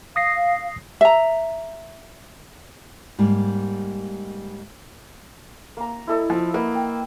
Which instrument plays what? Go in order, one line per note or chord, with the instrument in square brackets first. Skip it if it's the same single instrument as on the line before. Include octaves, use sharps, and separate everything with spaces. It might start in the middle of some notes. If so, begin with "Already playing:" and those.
[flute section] F5 [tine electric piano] D#6 A#6 C7
[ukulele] E5 A#5
[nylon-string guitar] G#2 G3 A#3
[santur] A#3 A#5
E4 A4 D#5
[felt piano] F3
[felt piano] A#3 [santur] B4 D#5 F#5
[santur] G5